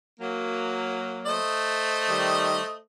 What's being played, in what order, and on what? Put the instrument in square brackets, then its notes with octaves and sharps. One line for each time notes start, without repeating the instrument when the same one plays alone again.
[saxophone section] F#3 A#3
[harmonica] A3 C5 D#5
[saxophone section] D#3 G3